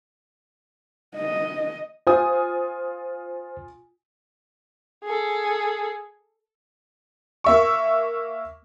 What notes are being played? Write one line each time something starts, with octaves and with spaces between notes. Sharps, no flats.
D#5
F4 C5 G#5 D#6
G#4 A4
A#3 E5 C#6